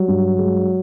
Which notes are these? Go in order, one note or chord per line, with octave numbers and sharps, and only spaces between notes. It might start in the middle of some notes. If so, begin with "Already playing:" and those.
Already playing: F#3 G3
G2
G#3